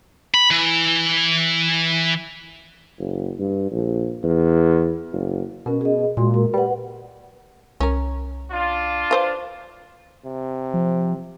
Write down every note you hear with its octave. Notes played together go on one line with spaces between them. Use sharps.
B5
E3
F#1
G2
A#1
E2
F#1
B2 C#4 A#4
G#4 D#5
A#2 G#3 F#4 C6
A#4
G3 B4 F#5
C2 C#4 A#4
D4 F4
B4 C5 F5
C3
F3